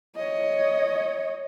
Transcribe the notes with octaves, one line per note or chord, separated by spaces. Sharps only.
C#5 D#5